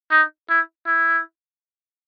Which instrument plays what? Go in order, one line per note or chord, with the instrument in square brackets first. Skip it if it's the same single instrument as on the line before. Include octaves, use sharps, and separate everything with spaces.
[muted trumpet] D#4
E4
E4